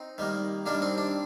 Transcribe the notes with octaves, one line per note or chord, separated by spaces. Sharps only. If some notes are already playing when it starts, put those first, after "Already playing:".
Already playing: C4 D#4
D#3 G3 A#3
D#3 G3 A#3 D4
C4
D4